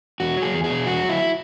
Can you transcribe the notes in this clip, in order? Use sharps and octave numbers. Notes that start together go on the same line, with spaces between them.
E2 F#4
F#3 G#4
E2
G#4
B2
E2 F#4
F#3
E4